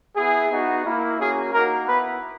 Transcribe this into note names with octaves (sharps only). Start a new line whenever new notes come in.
B3 E4 G#4
B3 D#4 F#4
A#3 E4
A#3 C#4 F#4 G#4
A#3 D#4 F#4 A#4
B3 E4 B4